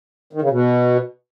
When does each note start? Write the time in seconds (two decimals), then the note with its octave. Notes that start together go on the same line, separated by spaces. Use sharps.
0.33 D#3
0.41 C#3
0.50 B2